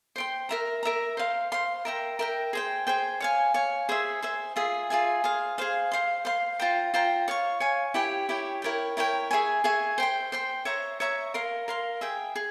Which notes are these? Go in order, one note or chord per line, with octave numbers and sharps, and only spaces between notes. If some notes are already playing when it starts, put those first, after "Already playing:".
C5 G5 C6
A#4 E5 A#5
A#4 E5 A#5
C5 F5 C6
C5 F5 C6
A#4 E5 G5 A#5
A#4 E5 G5 A#5
G#4 C5 G5
G#4 C5 G5
C#5 F5 G#5
C#5 F5 G#5
G#4 C5 E5
G#4 C5 E5
F4 G#4 E5 G#5
F4 G#4 E5 G#5
G#4 C5 F5
G#4 C5 F5
C5 F5 C6
C5 F5 C6
F4 C5 G5 A#5
F4 C5 G5 A#5
C#5 F5 G#5 C#6
C#5 F5 G#5 C#6
E4 G4 C#5 G5
E4 G4 C#5 G5
E4 A#4 C#5 G5
E4 A#4 C#5 G5
G#4 E5 G#5 C#6
G#4 E5 G#5 C#6
C5 G5 C6
C5 G5 C6
C#5 E5 A#5 C#6
C#5 E5 A#5 C#6
A#4 F5 C6
A#4 F5 C6
G#4 E5 G5
G#4